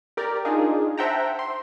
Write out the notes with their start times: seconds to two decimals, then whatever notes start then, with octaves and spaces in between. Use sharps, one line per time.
0.17 G4 A#4 D5
0.45 D4 D#4 F4 G#4
0.98 C5 E5 F#5 G5 A5 A#5
1.39 C6